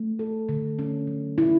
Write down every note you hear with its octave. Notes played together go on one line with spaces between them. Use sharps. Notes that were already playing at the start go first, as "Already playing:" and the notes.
Already playing: A3
A4
D3
C#4
F#3
E4